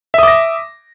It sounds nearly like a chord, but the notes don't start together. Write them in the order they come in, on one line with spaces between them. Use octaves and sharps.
E5 D#6 D6 A#6